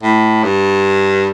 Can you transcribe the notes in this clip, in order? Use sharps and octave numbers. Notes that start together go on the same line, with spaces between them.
A2
G2